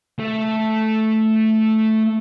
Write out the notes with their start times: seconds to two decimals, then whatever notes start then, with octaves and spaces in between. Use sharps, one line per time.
0.19 A3